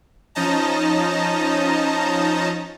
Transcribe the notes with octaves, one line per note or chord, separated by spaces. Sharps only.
F3 C#4 D#4 D#5 A5 A#5